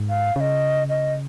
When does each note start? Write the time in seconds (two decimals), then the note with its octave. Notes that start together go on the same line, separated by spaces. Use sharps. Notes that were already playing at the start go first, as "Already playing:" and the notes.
Already playing: G#2
0.09 F5
0.36 C#3 F5
0.40 D#5
0.89 D#5